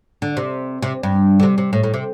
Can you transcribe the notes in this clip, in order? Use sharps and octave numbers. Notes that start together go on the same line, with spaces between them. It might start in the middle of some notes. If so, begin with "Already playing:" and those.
D3
C3
C3
G2
D3
C3
C3
A2
A2
C3